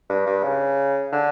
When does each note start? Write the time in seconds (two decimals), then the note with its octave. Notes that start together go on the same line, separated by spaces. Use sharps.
0.10 G2
0.27 G2
0.44 C#3
1.12 D3